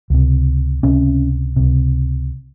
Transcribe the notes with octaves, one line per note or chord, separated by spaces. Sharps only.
C#2 C3
C#2 C3 C#4
C#2 C3